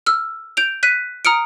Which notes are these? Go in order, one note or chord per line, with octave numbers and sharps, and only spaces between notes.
E6 F6
G6 D7 F7
F#6 B6 D#7
A#5 D#6 F6 C#7 D7